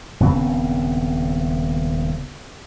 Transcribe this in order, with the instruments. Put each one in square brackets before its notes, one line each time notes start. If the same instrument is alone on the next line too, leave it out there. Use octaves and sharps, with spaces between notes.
[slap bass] D#1 C#3 B3 C4